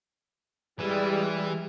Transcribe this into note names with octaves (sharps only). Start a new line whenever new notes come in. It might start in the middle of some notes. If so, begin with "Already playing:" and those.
E3 G3 G#3